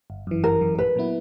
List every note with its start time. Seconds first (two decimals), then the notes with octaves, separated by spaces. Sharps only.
0.10 G1
0.27 F#2 E3
0.44 G1 A#4
0.61 F#2 E3
0.78 A#1 B4
0.95 A#2 F#3 B3 E4